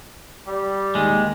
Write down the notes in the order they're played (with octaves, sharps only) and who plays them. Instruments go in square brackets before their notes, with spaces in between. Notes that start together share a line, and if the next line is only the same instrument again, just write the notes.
[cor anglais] G3
[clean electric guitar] D#2 G#3